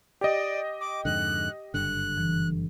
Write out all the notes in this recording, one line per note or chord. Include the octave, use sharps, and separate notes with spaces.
G4 D5 D#5
D6
F2 G#2 D3 F#6
F#1 G2 D3 F#6
E3